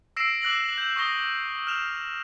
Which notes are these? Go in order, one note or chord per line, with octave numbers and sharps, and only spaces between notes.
E6 A#6 C7 D7 E7
D6 F#6 A#6 F#7
G6 E7
C#6 D#6 A#6 G7
F6 E7 F7